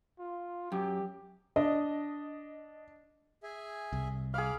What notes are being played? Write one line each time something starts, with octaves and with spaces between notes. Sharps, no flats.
F4
F#2 G4
D4 D#5
G#4 E5 G#5
C2
G#4 F5 B5 D6 F6